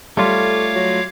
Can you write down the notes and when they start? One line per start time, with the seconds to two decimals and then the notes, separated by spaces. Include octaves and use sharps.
0.17 G3 A3 F4 A4 C#5 F5 D6
0.75 F#3